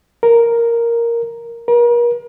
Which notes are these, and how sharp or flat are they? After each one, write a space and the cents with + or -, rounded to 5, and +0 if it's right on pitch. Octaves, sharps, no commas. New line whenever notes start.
A#4 +0
A#4 +40